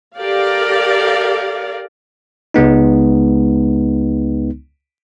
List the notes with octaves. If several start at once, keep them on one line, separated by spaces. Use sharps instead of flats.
G4 A4 A#4 D5 F5
C#2 G#3 B3 D#4